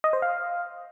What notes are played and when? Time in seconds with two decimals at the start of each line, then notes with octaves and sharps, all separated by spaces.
0.04 D#5
0.13 C5
0.22 F5